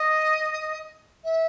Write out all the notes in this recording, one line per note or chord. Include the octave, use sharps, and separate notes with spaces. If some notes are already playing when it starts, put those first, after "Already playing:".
Already playing: D#5
E5